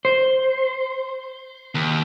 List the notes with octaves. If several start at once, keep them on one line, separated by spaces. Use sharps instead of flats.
C5
D#2